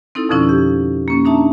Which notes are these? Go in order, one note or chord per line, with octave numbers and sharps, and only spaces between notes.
C4 D#4 E4 A4
F2 B2 D3 F3 C#4 E4
G4
A#3 C#4
A#3 D4 D#4 E5 A5 A#5